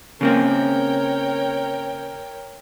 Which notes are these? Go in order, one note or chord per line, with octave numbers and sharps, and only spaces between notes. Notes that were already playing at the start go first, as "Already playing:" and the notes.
C#3 A#3 C4 A#4 C#5 G5